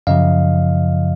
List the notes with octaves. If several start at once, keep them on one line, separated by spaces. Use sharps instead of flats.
F#2 C#3 F3 D#5 F5